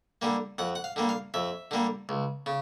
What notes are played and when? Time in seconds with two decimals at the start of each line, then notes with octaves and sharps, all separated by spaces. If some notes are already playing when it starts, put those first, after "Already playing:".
0.22 D3 G3 A#3
0.58 F2 F#5
0.75 F#5
0.84 F5
0.96 D3 G3 A#3
1.09 F5
1.34 F2 E5
1.71 D3 G3 A#3
2.09 C#2
2.46 C#3